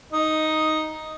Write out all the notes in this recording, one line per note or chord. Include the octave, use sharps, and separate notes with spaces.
D#4